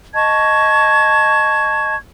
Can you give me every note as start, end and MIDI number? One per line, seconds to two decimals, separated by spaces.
0.14 1.95 75
0.14 1.95 81
0.14 1.95 85
0.14 1.95 92